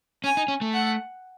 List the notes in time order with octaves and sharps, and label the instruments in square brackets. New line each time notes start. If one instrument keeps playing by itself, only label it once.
[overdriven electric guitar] C#4 [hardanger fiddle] G#5
[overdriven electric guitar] D#4
C#4
A3
[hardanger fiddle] F#5